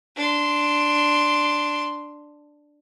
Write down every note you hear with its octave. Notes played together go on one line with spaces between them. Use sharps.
D4 C6